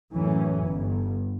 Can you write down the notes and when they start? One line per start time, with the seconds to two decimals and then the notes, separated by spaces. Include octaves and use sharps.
0.12 F#2 A2 E3 C#4
0.64 G1 G2